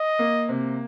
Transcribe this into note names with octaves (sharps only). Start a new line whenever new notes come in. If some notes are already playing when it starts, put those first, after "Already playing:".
Already playing: D#5
A#3
C3